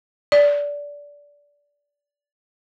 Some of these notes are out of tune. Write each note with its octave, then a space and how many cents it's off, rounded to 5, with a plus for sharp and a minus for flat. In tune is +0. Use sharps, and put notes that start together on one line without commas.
D5 -20